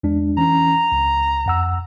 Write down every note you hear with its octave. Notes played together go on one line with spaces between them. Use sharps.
E2 G#3 D4
E3 C#4 A#5
C#2
F2 F#5 E6